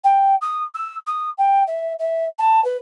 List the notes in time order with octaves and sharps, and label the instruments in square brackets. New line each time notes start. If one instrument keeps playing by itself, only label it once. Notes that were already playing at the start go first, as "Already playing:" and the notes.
[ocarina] G5
D#6
E6
D#6
G5
E5
E5
A5
B4